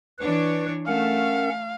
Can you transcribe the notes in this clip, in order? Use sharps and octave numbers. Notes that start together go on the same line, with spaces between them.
E3 D4 B4 C#5
A3 C#4 A#4 F5 F#5